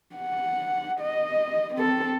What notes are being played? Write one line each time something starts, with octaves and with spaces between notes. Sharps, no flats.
F#5
D#5
C4 A4